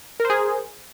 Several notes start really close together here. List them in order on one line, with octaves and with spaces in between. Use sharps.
A#4 C5 G#4